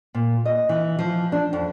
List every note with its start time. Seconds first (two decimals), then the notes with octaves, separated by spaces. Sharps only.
0.15 A#2
0.46 D#5
0.69 E3
0.99 F3
1.32 D4
1.53 F2